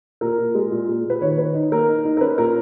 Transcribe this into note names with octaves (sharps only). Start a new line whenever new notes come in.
A#2 A#4
A#2
G#3
A#2
A#2
A#2
B4
D#3 C#5
D#3 B4
D#4
A#3 A#4
D#4
D#4
A#4
C#4 B4
A#2 A#4